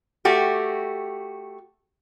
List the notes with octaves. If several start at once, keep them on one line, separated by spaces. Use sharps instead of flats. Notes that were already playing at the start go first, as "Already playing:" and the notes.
A3 F#4 G4